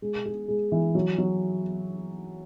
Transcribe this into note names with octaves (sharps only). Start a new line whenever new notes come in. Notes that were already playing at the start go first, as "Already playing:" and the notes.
G#3
G#4
G#3
E3
F#3
F#3